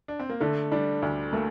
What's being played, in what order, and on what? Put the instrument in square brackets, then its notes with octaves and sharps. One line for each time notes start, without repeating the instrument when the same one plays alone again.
[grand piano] D4
C4
A#3
[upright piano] D3 [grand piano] A3
[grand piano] G3 [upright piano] D4
[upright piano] D2
[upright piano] A3 [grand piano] A#3